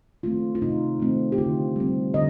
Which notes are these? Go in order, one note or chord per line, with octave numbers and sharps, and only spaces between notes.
D#3 A3 C4 F4
F4
C3 D#4
D#3 A3 C4
G4
D3 F4
G3 C4
D3 D#5